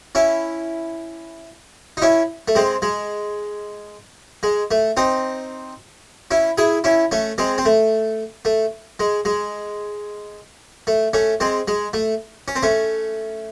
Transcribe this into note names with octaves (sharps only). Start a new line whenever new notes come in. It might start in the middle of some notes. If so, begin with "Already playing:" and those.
C#4 E4
D#4
C#4 E4
A3
G#3 C4
G#3
G#3
A3
C4 D#4
C#4 E4
E4 G#4
C#4 E4
A3 C#4
G#3 C4
C4
A3
A3
G#3
G#3
A3
A3 C#4
G#3 C4
G#3
A3
C#4
C4
A3 C#4